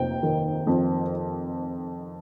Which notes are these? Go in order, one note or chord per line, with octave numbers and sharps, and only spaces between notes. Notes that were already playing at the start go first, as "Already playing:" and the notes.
Already playing: F1 A#3 G5
D#3
F2